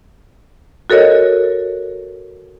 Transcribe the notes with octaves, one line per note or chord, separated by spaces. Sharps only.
F#4 A4 A#4 C#5 D#5